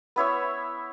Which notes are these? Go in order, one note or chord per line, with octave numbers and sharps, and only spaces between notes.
B3 E4 C#5 E5